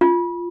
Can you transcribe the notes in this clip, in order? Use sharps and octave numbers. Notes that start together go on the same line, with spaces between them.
F4